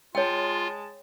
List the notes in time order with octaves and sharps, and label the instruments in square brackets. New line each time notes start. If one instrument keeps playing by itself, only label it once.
[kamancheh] G#3 A5 [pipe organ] F4 [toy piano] C#5 G5